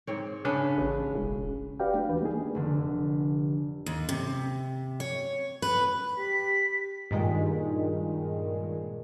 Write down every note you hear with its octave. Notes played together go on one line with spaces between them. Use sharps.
G#2 C4 C#5
C#3 C#4 D4 B4
A1
E1
F#4 G4 B4 D5 F5 G5
A3 D4
D2 E3 B4
A3 A#3 D4 D#4 G#4
F1 D3
D#2
C3
C#5
B4
G4 B6
G2 A#2 D#3 G#3